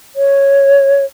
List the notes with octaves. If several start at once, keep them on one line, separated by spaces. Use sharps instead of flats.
C#5